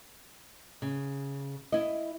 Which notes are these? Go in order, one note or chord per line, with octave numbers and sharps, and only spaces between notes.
C#3
E4 D#5